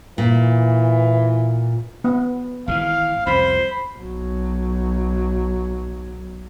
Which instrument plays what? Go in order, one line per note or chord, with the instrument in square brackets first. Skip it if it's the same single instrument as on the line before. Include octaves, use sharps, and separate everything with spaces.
[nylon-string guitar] A#2 [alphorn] E3
[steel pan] B3
[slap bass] G#1 C3 E3 [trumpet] F5
[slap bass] C2 F2 [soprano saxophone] C5 [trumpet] B5
[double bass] B1 F#3